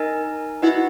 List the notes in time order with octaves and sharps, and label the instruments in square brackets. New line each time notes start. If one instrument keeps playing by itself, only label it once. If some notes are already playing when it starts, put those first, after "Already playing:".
Already playing: [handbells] D#4 A#4 D#5 G#5
[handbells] D#4 F#4 B4 D#5 F#5 [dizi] E4